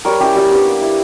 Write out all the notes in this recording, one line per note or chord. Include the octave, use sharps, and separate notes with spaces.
G3 A#4 C#5
C#4 E4 G4
G3 G4
B3 D4 G4
A#3
E4